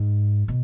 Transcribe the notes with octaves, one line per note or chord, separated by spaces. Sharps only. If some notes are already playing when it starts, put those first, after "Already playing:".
Already playing: G#2
B2